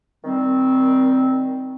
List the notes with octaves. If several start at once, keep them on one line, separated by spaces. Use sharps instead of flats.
D#3 G3 C4